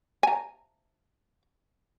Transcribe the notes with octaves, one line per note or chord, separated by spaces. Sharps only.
G#5 A#5